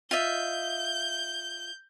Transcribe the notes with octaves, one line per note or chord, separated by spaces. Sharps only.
F4 D#5 E5 G6